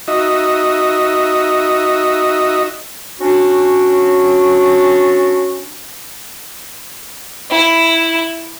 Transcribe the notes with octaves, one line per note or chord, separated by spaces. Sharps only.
D#4 F#4 D#5 E5
C#4 D4 F#4
E4